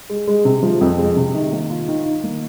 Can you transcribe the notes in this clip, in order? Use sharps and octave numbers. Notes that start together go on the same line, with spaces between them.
G#3
G#3
C3
F3
F2
G#3
C3
D#3
A#3
F4
D#3
D#3
A#3